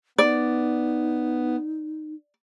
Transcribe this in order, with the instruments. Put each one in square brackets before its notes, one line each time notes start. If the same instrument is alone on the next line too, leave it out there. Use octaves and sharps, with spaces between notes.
[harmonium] B3 [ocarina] D#4 [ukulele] D5